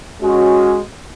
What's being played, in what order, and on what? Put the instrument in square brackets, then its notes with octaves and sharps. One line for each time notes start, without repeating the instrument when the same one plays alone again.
[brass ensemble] G#3 C#4 F#4